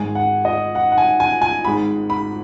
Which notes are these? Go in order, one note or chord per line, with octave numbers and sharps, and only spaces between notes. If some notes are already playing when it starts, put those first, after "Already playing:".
Already playing: G#1 G#2 G#3 G#5
F#5
D#5
F#5
F#5
G#5
G#5
G#5
G#1 G#2 G#3 B5
B5